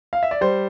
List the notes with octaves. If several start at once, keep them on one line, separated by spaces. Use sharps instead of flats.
F5
E5
D5
G3 C5